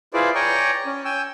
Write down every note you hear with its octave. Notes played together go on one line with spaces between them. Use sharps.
E4 F4 G#4 B4 C5 D5
C#5 D5 G5 G#5 A#5 C#6
C#4
G5 G#5 E6